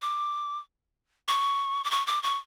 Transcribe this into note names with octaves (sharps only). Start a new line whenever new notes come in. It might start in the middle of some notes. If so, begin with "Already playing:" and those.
D6
C#6
D6
C#6
D6
C#6